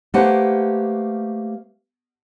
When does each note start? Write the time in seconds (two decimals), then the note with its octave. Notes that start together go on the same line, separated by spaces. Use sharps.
0.14 A3 A#3 G4 B4 C5 F#5